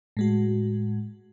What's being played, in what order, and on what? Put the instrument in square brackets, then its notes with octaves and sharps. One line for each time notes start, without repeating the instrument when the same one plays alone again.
[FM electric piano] A2 G#3 F#4